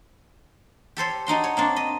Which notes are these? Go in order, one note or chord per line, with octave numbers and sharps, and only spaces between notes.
G4 A4 C5 C#5
D4 D#4 F#4 C6
C#5
A#3 C4 D4
D#5